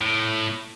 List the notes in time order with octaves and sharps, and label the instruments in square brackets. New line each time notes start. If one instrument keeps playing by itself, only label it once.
[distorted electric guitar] A2